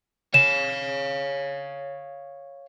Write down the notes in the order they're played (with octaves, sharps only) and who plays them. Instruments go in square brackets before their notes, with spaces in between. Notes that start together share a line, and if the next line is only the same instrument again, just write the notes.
[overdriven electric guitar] C#5 F5 [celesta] E7